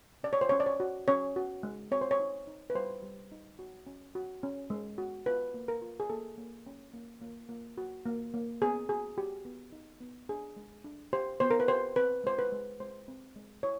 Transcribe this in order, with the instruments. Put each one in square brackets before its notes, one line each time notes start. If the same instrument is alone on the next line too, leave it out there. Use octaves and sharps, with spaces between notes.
[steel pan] C#4 D5
C#5
C5
C#4 C#5
D5
C#5
F#4
C#4 C#5
F#4
G#3
C4 C#5
C5
C#5
D#4
D#4
B4
G3 C5
G3
D#4
F#4
C#4
F#4
C#4
G#3
F#4
F4 B4
A#3
A#4
F4
G#4
A#3 A4
A#3
C#4
A#3
A#3
A#3
F#4
A#3
A#3
B3 G#4
F#4 G#4
F#4 G4
B3
D#4
B3
D4 G#4
G#3
D4
G4 C5
B3 C5
A#4
B4
G4 C5
C4 B4
G#3 C5
B4
G#3
G#3 C5
C4
G#3
E4 C#5